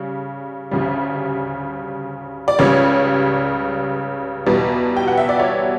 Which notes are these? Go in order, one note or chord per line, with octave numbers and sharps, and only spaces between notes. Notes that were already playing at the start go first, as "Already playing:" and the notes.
Already playing: C#3 G3
D2 C#3 G3
D5
C#2 C#3 G3 C#5
E2 B2 G3
G5
F#5
E5
D5
C#5